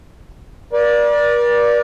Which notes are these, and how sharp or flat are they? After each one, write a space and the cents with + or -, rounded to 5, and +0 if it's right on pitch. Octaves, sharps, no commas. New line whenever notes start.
A#4 +45 D5 +0